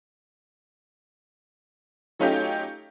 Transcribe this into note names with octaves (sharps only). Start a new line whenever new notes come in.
F#3 A3 C#4 D#4 F4 G4